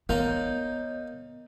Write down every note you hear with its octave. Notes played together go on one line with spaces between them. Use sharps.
A#3 B3 D#4 C#5 D#5 A#5 G6